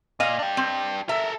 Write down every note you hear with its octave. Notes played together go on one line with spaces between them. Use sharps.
A#2 D#5 F5
D4 G4
C4
A4 A#4 E5